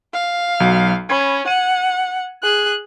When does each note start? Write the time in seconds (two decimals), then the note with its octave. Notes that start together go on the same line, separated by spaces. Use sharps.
0.13 F5
0.60 B1 F#3
1.10 C#4 B5 G#6
1.48 F#5 D#7
2.42 G#4 F#6